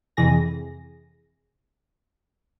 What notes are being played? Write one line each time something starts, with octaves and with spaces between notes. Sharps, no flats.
F2 C3 E3 G#4 A#6